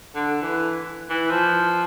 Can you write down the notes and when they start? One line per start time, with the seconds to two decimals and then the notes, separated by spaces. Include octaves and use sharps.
0.15 D3
0.42 E3
1.10 E3
1.31 F3